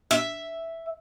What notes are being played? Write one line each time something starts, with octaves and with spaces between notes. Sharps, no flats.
E5